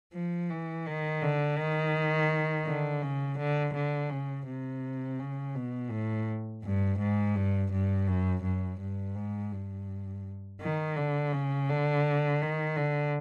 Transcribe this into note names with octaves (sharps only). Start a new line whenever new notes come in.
F3
E3
D#3
D3
D#3
D3
C#3
D3
D3
C#3
C3
C#3
B2
A2
G2
G#2
G2
G2
F#2
F#2
G2
G#2
G2
D#3
D3
C#3
D3
D#3
D3